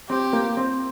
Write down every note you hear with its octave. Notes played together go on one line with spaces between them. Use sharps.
C4 G4
A#3
C4